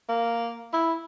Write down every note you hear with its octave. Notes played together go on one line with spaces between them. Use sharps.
A#3
E4